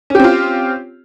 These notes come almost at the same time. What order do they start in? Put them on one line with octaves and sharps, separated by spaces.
C#4 G4 C4 F4